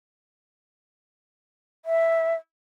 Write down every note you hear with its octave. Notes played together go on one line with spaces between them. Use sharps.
E5